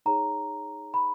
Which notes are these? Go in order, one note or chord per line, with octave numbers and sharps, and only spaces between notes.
D#4 G#4 C#5 A#5
B5